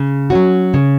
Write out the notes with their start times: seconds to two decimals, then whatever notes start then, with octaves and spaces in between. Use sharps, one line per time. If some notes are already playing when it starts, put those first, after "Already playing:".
Already playing: C#3
0.30 F#3 C#4 F#4
0.74 C#3